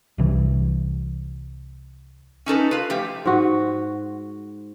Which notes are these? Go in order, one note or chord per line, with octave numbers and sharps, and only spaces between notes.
C2 C3 E3
C#4 D#4 A4 B4
F4 B4
F3 A3 G4
G#2 F#4